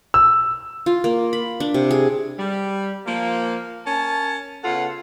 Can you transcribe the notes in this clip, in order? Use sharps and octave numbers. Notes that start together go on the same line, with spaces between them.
E6
F4
A#3
B5
D4
C3
G#4
G3
F3 A#3
C#4 A#4 A5
C#3 B3 F4 A4 F#5